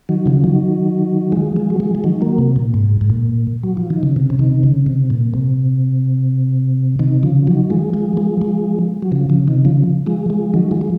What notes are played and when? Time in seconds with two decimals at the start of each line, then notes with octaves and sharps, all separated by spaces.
0.09 D#3 F#3
0.26 C#3 F3
0.44 D#3 F#3
1.32 F3 G#3
1.56 F3 G#3
1.70 F#3
1.80 F3 G#3
1.95 F3
2.04 D#3 F#3
2.21 F#3 A#3
2.38 C3
2.56 A#2
2.74 G#2
3.01 G#2
3.10 A#2
3.64 F#3
3.77 F3
3.90 D#3
4.03 C#3
4.16 C3
4.30 C#3
4.39 C3 D#3
4.63 C#3
4.86 C3
5.10 A#2
5.34 C3
6.99 C3 D#3
7.23 C#3 F3
7.47 D#3 F#3
7.70 F3 G#3
7.94 F3 G#3
8.17 F3 G#3
8.41 F3 G#3
9.02 F#3
9.12 C#3 F3
9.30 C#3
9.47 C3 D#3
9.65 C#3 F3
10.06 F3 G#3
10.30 F3 G#3
10.54 D#3 F#3
10.71 F3 G#3
10.81 G#3